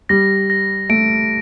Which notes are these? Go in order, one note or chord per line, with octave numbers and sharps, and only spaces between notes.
G3 A#6
A#6
A3 D7